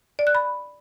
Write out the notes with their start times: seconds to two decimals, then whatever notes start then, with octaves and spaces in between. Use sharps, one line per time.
0.19 D5
0.27 F#6
0.35 B5